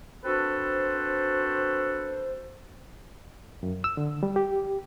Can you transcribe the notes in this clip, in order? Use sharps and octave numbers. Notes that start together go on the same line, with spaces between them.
C4 D4 F#4 A4 B4 C5
F#2
E6
D3
G3
G4